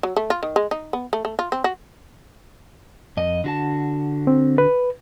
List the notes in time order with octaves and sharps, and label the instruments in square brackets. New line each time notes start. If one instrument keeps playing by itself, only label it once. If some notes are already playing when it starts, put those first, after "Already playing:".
[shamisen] F#3
A3
F4
D#3
G#3
D#4
B3
A3
A3
F4
C4
F#4
[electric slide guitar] F2 D#5
D3 F#4 A5
[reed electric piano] C4
B4